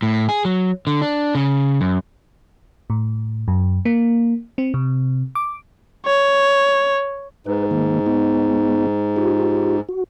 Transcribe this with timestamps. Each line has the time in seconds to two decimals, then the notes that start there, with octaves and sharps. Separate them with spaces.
0.02 A2
0.29 G#4
0.45 F#3
0.87 D3
1.02 D4
1.35 C#3
1.81 F#2
2.90 A2
3.48 F#2
3.85 A#3
4.58 C4
4.74 C3
5.35 D6
6.06 C#5
7.46 G#2 B4
7.71 D#3 A#3
8.06 G#3 B3 D#4
9.16 D#4 F4 G4
9.89 F#4